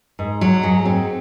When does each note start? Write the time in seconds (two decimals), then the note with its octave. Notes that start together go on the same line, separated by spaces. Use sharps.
0.19 G#2
0.41 F#3
0.63 G#2
0.85 C4